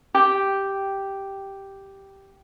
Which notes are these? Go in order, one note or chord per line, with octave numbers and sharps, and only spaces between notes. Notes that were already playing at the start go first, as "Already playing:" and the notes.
G4 G5